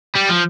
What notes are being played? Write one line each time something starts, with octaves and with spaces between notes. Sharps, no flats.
G3
F3